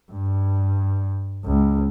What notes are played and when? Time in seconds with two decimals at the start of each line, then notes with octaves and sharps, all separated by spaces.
0.12 G2
1.45 C#2